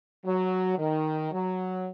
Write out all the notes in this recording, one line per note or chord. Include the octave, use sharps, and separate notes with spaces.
F#3
D#3
F#3